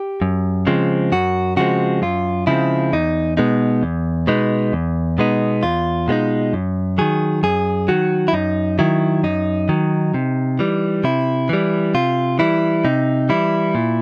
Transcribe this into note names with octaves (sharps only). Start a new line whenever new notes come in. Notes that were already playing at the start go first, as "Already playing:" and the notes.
Already playing: G4
F#2
C#3 F3 G#3 C4
F#2 F#4
C#3 F3 G#3 C4 F#4
F#2 F4
C#3 F3 G#3 C4 E4
E2 D#4
B2 G#3 B3 D#4
E2
B2 G#3 B3 D#4
E2
B2 G#3 B3 D#4
E2 F4
B2 G#3 B3 D#4
F#2
D#3 F#3 G#4
F#2 G#4
D#3 F#3 F#4
E4
F#2 D#4
D#3 F#3 E4
F#2 D#4
D#3 F#3
C3
E3 G3
C3 E4
E3 G3
C3 F4
E3 G3 E4
C3 D#4
E3 G3 E4
A#2